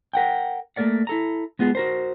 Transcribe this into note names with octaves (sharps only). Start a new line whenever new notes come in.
A#4 F#5 G5
A3 A#3 A#4 D5 F#5
E4 A4 A#5
G#3 B3 F4 G#4
F#4 A#4 C5